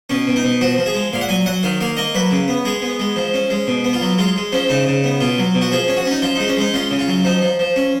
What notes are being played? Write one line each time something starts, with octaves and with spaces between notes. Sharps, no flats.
B2 C#4
B2
D#4
B2
F3 F#4
F3
G#4
G#3
A#2 F5
F#5
F#3 G#5
F#3 F#5
D#3 F5
A#3 F5
A#3 D#5
F#3 B4
C#3
B3
G#3 G#4
B3
G#3
F3
C#4
G#3
B2
B3
F4
F#3
G#3 F4
G#3
F3 C#4
C#3 D#4
C#3
B3
B2 F4
F#3
B2
F#4
F3 G#4
C#4
F#4
C#4
D#4
F3 F4
G#3 D#4
C#4
G#3 D#4
C#4 F4
C#3
F4
F#3
F3 D#4
F3
F3
C#4